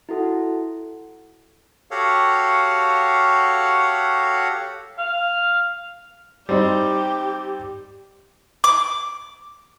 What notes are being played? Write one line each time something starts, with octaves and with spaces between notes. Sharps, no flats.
E4 F#4 A4 F#5
F#4 G4 A4 C#5 F5 F#5
F5
G3 C4 D#4 G4
D6